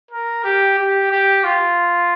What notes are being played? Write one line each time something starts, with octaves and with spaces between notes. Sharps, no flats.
A#4
G4
G4
G4
F4